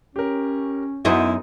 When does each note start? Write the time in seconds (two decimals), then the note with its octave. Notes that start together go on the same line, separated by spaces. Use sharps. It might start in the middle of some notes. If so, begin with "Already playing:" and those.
0.16 C#4 G4 A#4
1.05 F#2 B3 D#4 E4 G#5 C6 D#6